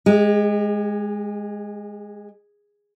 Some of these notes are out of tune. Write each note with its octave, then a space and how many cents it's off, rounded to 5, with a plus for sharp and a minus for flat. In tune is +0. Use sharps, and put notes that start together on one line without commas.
G#3 +0 G4 +45